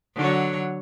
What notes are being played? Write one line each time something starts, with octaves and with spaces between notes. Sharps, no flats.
D3 F#3 C#5